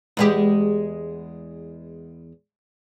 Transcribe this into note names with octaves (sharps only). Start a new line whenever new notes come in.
E2 G#3 G4